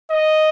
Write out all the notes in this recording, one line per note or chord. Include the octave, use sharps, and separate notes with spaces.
D#5